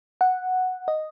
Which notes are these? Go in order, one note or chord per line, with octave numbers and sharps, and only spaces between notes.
F#5
D#5